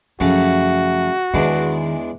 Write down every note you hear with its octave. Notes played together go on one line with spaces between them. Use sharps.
F#2 C#3 F3 A3 C#4 F#4
E2 D#3 G#3 D4